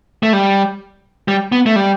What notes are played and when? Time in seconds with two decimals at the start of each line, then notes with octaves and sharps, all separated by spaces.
0.23 A3
0.33 G3
1.28 G3
1.52 B3
1.66 A3
1.76 G3